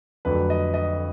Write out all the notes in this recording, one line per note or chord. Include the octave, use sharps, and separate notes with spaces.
F2 D3 F#3 A3 B4
D#5
D#5